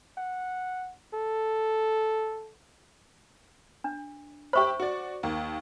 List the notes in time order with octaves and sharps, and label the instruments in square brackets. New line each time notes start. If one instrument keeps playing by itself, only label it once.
[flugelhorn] F#5
A4
[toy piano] D4
[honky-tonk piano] G4 E5 B5 [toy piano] C5 C#6
[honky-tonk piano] F#4 D5
D#2 A#3